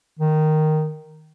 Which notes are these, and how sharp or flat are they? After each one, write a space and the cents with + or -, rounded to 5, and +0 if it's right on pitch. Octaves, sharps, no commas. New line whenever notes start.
D#3 -5